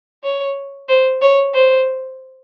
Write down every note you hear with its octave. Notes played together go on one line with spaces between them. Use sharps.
C#5
C5
C#5
C5